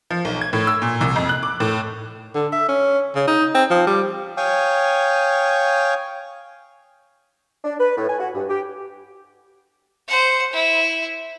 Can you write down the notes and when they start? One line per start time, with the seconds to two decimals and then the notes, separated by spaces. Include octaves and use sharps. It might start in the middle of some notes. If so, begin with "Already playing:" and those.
0.10 F3
0.25 B1
0.41 G#6
0.53 A2
0.67 E6
0.82 A#2
1.01 C2
1.16 F2
1.29 F#6
1.43 D6
1.60 A2
2.35 D3
2.52 E5
2.68 C#4
3.15 C#3
3.28 D#4
3.55 C4
3.70 F3
3.87 G3
4.37 C#5 F5 G5 G#5 C#6 D#6
7.64 D4
7.79 B4
7.96 A2
8.08 G#5
8.20 F#4
8.34 G2
8.49 G4
10.07 C5 F#5
10.53 E4